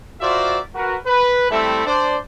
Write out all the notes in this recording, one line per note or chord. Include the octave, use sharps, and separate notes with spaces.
F4 F#4 A#4 C5 D5 E5
F#4 A#4 B4
B4
G3 A3 C4 E4 A4 E5
D4 C5 D5